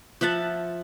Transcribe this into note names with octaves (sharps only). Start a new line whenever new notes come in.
F3 E5 F#5 A5